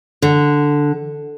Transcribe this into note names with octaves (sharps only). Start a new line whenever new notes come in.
D3